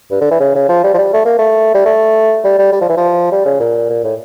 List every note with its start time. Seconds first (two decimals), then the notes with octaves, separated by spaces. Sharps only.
0.11 G2
0.21 D3
0.31 E3
0.40 C#3
0.55 C#3
0.69 F3
0.84 G3
0.94 F3
0.98 G3
1.13 A3
1.25 A#3
1.38 A3
1.74 G3
1.86 A3
2.44 G3
2.58 G3
2.72 G3
2.81 F3
2.89 E3
2.97 F3
3.32 G3
3.45 C#3
3.60 A#2
3.90 A#2
4.04 A2